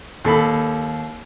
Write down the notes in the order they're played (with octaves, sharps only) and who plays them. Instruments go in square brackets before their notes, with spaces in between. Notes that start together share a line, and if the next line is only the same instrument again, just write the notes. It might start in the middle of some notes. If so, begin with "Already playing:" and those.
[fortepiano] D#2 A4 B5